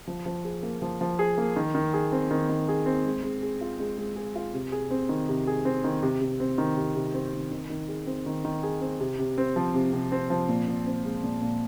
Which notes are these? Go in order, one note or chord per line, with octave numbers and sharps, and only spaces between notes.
F3
F3
G#4
A#3
F3
F3
G#4
A#3
D#3
D#3
G#4
C4
D#3
D#3
G#4
C4
G#3
G#3
G#4
F4
G#3
G#3
G#4
F4
C3
G#4
C4
D#3
C3
G#4
C4
D#3
C3
C3
C4
D#3
C3
C3
C4
D#3
D#3
D#3
G#4
C4
D#3
D#3
G#4
C4
C3
C3
C4
F3
C3
C3
C4
F3
A#2
A#2
C4
G#3
A#2
A#2